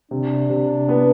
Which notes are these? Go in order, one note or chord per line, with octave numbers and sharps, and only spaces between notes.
C3 D4
C3
B3